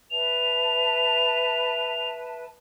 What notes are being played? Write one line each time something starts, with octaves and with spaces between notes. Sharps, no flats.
B4 E5 A5 F7